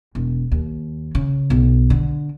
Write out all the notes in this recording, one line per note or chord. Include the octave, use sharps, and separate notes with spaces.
E1
D#2
C#3
B1
D3